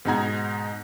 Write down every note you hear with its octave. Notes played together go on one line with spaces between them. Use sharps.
G#2 B2 D#4 F#5 A#5 G#6